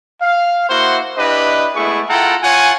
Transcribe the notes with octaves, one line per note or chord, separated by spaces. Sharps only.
F5
A#3 E4 F#4 C5 F#5 C6
D4 E4 G4 B4 D#5
G#3 A3 B3 E4 G#4 C#6
E4 F4 A4 F#5 G5 A#5
F4 C#5 F#5 G#5